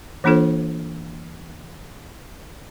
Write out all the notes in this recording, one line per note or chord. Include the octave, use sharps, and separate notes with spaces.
E3 A#3 D4 F4 A4 C5